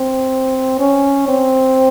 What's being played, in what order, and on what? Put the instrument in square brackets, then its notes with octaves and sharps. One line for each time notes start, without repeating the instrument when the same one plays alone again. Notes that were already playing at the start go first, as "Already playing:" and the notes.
Already playing: [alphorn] C4
C#4
C4